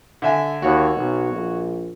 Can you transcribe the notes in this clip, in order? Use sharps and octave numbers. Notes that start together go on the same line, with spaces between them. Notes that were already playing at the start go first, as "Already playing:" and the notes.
D3 E5 G#5
D#2 F#4 C#5
B1
A#1